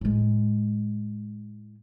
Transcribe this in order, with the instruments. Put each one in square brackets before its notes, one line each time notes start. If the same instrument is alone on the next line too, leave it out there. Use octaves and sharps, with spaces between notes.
[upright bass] A2 G#3